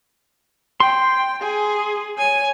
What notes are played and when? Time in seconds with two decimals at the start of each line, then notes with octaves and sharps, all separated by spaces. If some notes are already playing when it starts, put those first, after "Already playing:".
0.80 G5 C6
1.43 G#4 G#5
2.18 C#5 G#5